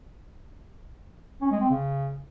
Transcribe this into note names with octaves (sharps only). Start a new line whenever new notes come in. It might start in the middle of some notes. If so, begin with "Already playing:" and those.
C#4
G#3
C4
C#3